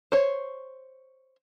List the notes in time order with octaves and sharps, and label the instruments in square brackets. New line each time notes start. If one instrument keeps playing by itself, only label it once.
[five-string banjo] C5 C#5